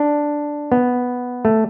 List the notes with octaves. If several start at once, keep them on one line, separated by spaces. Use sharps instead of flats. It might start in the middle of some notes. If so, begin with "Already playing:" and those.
Already playing: D4
B3
A3